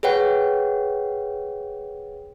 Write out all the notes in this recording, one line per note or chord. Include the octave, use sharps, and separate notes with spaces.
G#4 B4 C#5 F#5 G5